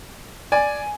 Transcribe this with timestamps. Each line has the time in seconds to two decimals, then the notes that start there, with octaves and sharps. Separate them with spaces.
0.52 D5 G#5